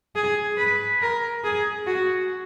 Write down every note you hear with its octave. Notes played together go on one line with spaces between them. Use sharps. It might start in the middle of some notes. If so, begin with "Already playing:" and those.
G#4
B4
A#4
G#4
F#4